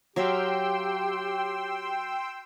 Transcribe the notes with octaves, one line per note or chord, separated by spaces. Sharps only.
F#3 G4 E5 F5 G5 C6 E6